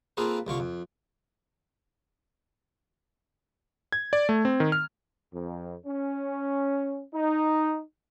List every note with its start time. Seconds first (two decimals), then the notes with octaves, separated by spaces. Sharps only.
0.17 A#3 C4 F4 G#4 A4 B4
0.47 C2 D3 F4 C#6
0.60 F2
3.92 G#6
4.13 D5
4.29 A3
4.45 C4
4.60 D#3
4.72 F6
5.34 F2
5.86 C#4
7.14 D#4